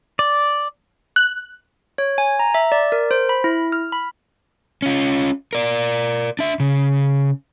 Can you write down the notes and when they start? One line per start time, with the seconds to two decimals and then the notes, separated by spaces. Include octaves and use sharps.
0.19 D5
1.16 F#6
1.98 C#5
2.18 G#5
2.39 A#5
2.54 E5
2.72 D5
2.92 A#4
3.11 C5
3.29 B5
3.44 E4
3.72 F6
3.92 B5
4.82 C#4 F4
5.53 A#4 D5
6.39 D4 E5
6.60 C#3